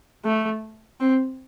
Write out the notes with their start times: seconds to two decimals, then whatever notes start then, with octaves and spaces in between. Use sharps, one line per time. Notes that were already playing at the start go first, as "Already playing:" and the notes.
0.25 A3
1.00 C4